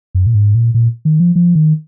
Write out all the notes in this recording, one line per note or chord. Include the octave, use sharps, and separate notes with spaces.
F#2
A#2
G#2
A#2
A#2
D#3
F3
F3
D#3